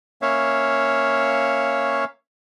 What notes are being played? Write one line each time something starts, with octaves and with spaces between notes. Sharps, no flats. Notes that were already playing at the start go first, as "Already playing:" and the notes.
A#3 C#4 C#5 E5 F5